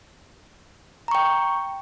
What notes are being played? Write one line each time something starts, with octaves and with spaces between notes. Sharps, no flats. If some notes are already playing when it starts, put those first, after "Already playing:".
G5 A#5 C#6